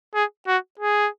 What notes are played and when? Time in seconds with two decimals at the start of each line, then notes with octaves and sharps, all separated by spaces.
0.14 G#4
0.47 F#4
0.79 G#4